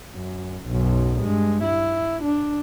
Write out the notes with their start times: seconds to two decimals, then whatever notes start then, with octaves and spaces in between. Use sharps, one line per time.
0.14 F#2
0.67 B1 F#2
1.19 G2 G#3
1.64 E4
2.24 D4